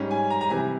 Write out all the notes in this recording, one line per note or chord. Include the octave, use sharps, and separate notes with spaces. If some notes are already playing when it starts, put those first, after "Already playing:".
Already playing: G#2 G3 C#4
G#5
A#5
A#5
C3 E3 G3 C4 G#5